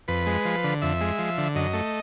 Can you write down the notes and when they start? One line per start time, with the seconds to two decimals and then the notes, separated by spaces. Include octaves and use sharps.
0.08 F2 B4
0.27 G#3
0.45 F3
0.64 D3
0.82 F2 E5
1.01 G#3
1.19 F3
1.38 D3
1.55 F#2 D#5
1.73 A3